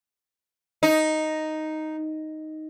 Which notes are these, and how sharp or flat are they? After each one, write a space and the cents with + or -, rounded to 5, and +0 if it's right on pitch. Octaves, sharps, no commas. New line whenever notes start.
D#4 +0